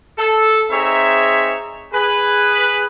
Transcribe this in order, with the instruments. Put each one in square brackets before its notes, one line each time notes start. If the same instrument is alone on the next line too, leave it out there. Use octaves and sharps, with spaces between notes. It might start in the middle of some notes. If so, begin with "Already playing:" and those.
[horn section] A4
C4 D#4 G#4 C#5 E5
G#4 B4